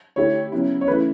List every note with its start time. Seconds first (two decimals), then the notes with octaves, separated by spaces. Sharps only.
0.16 D3 A3 E4 G4 C#5
0.52 C#3 F#3 B3 E4
0.81 C#5
0.88 C#3 E3 A3 E4 B4